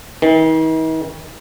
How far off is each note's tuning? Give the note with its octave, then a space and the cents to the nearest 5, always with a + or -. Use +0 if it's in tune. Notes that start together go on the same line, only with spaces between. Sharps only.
D#3 +45